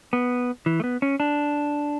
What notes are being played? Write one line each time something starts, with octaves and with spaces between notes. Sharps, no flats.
B3
E3
A3
B3
C#4
D4